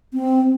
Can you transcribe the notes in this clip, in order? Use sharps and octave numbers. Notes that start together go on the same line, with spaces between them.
C4